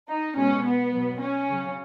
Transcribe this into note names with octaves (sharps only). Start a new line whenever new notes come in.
D#4
B2 G#3 C#4
B3
B2 F#3
C#4
C#3 F#3